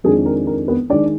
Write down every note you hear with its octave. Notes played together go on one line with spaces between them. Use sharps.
F2 D#3 G#3 D4 G#4
A#4
A#4
B3 B4
D#3 G#3 D4 D5